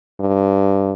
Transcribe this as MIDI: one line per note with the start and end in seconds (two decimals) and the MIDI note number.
0.20 0.93 43